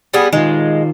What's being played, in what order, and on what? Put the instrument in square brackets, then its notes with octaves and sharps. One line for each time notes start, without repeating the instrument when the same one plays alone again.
[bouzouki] G3 B3 G#4
[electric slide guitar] D#3 F4 [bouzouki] G#3